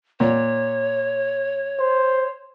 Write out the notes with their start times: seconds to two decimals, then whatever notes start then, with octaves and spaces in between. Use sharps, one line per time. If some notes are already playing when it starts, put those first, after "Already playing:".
0.20 A#2 C#5
1.79 C5